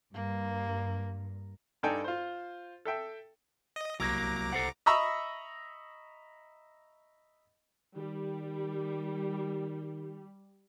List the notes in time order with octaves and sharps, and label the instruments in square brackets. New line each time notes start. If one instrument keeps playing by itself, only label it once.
[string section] G2 [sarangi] A#3
[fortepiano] G2 D#4 A4 D5 G5 G#5
F4 C5
A4 E5 G5
[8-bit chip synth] D#5
[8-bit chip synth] C2 A#5 D6 [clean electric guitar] F#3 A#3
[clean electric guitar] A4 C5 F#5
[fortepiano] D#5 E5 A#5 B5 C#6 E6
[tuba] D#3 [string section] G3